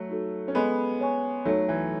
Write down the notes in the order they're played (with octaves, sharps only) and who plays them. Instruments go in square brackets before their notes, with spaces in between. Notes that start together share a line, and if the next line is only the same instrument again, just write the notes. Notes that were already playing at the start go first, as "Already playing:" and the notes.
Already playing: [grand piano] F#3 A3
[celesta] D#4 F#4 A4
[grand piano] C#4
[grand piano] G#3 B3 [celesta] A4 D#5 G#5 B5
[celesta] C#5 G#5 C#6
[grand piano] F#3 A3 [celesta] D#4 A4 C#5
[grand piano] E3